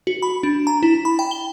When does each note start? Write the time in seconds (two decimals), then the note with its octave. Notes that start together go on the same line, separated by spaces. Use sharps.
0.07 F#4
0.22 B5
0.43 D4
0.67 A#5
0.83 E4
1.05 B5
1.19 G5
1.31 G7